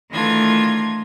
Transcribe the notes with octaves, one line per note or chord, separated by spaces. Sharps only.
D#3 E3 A3 D4 F4 G#6